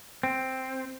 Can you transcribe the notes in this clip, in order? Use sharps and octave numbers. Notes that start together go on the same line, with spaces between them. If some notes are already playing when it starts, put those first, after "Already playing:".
C4